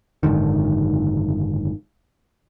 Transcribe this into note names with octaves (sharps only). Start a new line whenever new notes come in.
F#1 G#2 D3 D#3